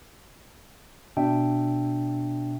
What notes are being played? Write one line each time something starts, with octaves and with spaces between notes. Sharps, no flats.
B2 D4 E5 G5